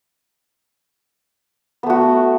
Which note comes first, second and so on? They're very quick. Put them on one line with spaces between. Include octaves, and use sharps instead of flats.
B3 A3 F#4